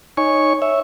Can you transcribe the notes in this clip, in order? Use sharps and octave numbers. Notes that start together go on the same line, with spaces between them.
D#4 C#5 G#5 C#6
C#5 E5